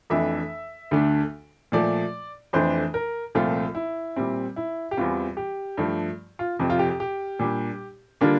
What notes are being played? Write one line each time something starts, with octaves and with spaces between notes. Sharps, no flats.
F2 E3 A3 D4 E5
D2 D3 A3 D4
A#2 F3 A3 D5
F2 E3 A3 D4 C5
A#4
C2 A#2 F3 A3 C4 F4
E4
A#2 G3 C4
E4
G4
E2 E3 G3 C4 F4
G4
G2 F3 A3
F4
F2 C3 F3 C4
F4
G4
G4
G4
A#2 G3 D4
D3 G3 A#3 D4 F4